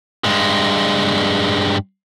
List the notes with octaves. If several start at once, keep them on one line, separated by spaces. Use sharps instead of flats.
G2 G#3